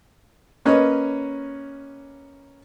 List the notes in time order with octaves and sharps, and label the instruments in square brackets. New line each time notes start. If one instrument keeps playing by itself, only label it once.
[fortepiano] A#3 C#4 B4 C#5 D#5